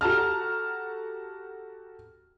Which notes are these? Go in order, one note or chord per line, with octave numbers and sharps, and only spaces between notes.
F#4 G4 A4 A5 A#5 F6